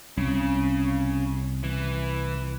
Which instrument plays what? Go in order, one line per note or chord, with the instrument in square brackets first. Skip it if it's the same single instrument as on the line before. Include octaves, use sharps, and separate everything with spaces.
[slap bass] C2 [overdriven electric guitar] C#3
[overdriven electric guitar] E3